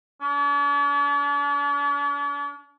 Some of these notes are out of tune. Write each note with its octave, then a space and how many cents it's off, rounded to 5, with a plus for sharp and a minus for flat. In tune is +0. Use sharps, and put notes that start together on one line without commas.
D4 -45